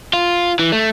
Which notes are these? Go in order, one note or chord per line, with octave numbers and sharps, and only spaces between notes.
F4
E3
A3